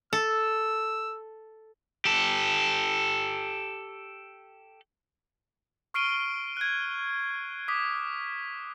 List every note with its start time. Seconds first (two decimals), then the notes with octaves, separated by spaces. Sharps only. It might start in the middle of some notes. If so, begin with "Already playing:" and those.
0.13 A4 E6
2.05 G4 A4
5.94 C#6 F6 C7 D7 D#7 G7
6.57 F#6 G#6
7.68 D6 D#6 B6